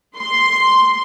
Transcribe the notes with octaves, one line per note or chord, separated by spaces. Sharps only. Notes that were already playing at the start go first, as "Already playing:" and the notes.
C6